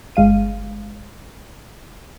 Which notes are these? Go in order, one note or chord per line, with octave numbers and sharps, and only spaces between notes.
G1 G#3 F5 D#7